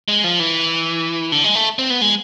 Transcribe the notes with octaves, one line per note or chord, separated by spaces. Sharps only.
G#3
F3
E3
D3
G#3
A3
C4
B3
G#3